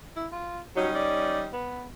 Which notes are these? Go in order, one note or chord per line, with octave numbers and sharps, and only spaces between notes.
E4
F4
F#3 G3 C#4 D#4
D5
B3